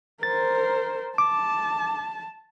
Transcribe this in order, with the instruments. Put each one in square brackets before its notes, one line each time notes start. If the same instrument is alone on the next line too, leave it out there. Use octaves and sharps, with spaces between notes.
[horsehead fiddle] A#4 C5 [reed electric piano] A6
[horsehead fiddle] A5 [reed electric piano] D6